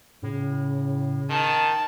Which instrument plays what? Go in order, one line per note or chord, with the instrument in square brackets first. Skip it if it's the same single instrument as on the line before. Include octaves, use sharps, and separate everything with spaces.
[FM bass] A2 [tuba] C#3
[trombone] D#3 [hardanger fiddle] A5